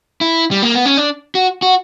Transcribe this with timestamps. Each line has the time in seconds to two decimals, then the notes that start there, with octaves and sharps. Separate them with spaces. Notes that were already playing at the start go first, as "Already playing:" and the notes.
0.21 E4
0.51 G3
0.62 A#3
0.74 B3
0.85 C#4
0.97 D4
1.35 F#4
1.62 F#4